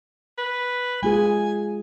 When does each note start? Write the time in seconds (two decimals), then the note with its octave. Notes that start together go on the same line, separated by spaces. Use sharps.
0.38 B4
1.03 G#3 F4 G#4 G#5